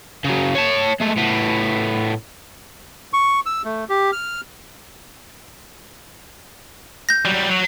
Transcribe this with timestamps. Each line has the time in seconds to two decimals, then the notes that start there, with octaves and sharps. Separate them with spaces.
0.25 C#3 F#3
0.55 C#5 A5
1.00 G#3 A3
1.17 A2 B3
3.13 C#6
3.46 E6
3.65 A3
3.89 G4
4.12 F6
7.09 G6 A#6
7.25 F#3 G3
7.48 F#3